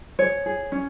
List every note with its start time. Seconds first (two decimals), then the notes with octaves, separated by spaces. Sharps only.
0.19 G#4 C#5
0.46 G#4
0.72 C#4